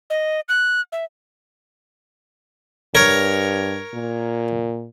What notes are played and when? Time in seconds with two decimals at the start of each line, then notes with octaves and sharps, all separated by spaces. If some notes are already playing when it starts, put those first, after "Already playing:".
0.10 D#5
0.49 F#6
0.92 E5
2.95 G2 A#4 C#5
3.94 A#2